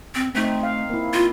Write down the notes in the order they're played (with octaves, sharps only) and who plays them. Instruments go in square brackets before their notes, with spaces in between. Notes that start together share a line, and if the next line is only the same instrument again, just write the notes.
[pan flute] C4
[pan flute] A3 [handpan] C4 D#4
[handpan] F5
A#3 E4
[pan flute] F4